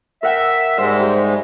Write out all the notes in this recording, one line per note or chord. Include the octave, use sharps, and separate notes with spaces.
A#4 E5 F#5 G5
G#2 G3 G#3 C5 E5
G4